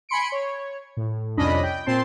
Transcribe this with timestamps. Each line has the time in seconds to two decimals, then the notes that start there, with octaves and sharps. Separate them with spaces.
0.09 G#5 B5 C6 C#7 D7
0.32 C#5
0.97 A2
1.37 C2 F2 C#4 D4 D#5 B5
1.63 G5
1.86 A#2 C4 A5 C6